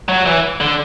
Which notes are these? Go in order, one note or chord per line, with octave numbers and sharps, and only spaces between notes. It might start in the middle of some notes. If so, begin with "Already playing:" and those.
F#3
E3
D3